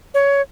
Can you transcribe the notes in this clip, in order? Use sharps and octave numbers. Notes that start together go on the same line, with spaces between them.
C#5